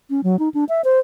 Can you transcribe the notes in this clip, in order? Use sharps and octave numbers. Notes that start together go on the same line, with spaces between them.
C#4
F#3
D#4
D4
E5
C5